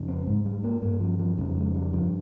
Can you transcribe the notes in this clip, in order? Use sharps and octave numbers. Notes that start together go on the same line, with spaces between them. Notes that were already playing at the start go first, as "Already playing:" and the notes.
Already playing: F2 C#3
C4
G#2 G#3
G3
A#3
G2 A#3
F3
F3
F2 C#3 G3
G#3
G3
G2 F3